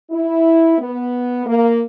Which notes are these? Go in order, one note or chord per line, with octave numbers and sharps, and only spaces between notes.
E4
B3
A#3